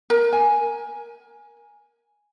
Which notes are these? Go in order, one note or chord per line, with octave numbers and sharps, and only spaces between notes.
A#4
G#5